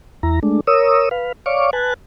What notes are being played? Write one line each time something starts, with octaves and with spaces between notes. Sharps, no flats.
E2 E4 A#5
G#3 A3 D4
A#4 C#5 D#6 E6
B4 F5
C#5 D5 F5 C#6 D6
B4 G#5 A5 F#6